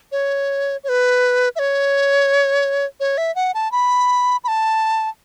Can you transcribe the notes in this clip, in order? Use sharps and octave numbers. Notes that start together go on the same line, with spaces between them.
C#5
C#5
B4
E5
C#5
C#5
E5
F#5
A5
B5
B5
A5